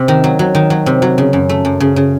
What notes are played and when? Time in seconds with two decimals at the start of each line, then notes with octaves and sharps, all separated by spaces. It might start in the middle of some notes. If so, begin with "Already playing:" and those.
Already playing: C3
0.08 D#3
0.24 F#3
0.39 F#3
0.55 D#3
0.70 F#3
0.86 C3
1.02 F#3
1.18 C#3
1.33 F#2
1.49 A3
1.65 F#2
1.80 C#3
1.96 C#3